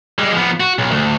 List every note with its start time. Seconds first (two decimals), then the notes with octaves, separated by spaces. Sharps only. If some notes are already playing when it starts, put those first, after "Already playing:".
0.19 G3 G#3
0.32 F3 B3
0.60 F#4
0.78 B1
0.91 D2